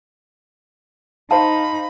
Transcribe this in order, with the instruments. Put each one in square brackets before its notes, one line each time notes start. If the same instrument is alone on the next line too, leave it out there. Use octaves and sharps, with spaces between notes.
[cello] D#4 [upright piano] C5 F5 [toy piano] A5 [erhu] B5